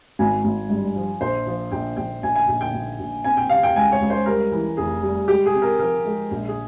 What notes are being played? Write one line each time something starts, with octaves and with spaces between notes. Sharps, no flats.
G#1 G#5
G#1
G2
F3
A#1 C5
F3
A#1 G5
A#1 G5
A#1 G#5
G#5
A#1
G5
A#1
A#1
C4 G#5
G5
C3 F5
G5
C#2 G#5
C#5
C#2
C5
G3 A#4
E3
F1 G#4
G3
G#3 G4
G#4
C3
A#4
F3 A#4
G#3
A#1
G#4